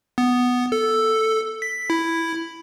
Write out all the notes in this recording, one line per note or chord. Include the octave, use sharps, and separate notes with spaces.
B3
A4
B6
E4